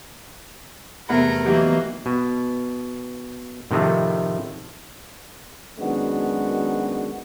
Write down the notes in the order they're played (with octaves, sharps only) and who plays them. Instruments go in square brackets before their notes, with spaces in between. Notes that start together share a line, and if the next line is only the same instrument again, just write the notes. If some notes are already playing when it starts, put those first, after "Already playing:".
[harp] E2 F#5 B5 [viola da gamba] C3 A3 A#4
[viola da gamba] E3 A#3 [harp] F#3 D#4 G4
[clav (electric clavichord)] B2
A2 C3 D#3 F3 A3
[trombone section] F#2 D#3 G#3 B3 D4 F#4